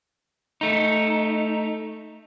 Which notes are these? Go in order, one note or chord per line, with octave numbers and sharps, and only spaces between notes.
A3 D#4